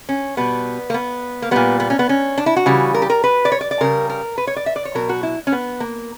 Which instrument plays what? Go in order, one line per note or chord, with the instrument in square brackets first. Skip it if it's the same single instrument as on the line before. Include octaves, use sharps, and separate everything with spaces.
[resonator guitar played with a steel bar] C#4
B2 G3 B3
A#3
B3
A#3
A#2 G3 B3
B3
C#4
B3
C#4
D4
E4
F#4
C#3 E3 G3
A#4
G4
A#4
B4
D5
C#5
D5
D5
C#3 G3 A#4
A#4
B4
C#5
D5
E5
D5
C#5
B2 F#3 A#4
F#4
E4
C#4
B3
A#3